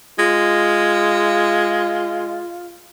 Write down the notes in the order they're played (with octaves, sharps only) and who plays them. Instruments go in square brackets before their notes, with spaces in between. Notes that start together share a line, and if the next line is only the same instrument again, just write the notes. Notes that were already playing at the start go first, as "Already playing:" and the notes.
[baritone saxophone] G#3 [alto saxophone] F4